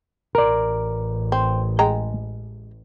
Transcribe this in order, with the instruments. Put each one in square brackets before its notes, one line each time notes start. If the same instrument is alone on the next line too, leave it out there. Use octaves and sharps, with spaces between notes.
[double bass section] A1 [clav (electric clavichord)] A#4 D5
[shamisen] C4
G#3 G5 A#5